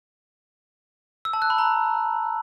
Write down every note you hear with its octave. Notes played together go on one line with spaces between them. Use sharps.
E6
A5
F#6
B5
A#5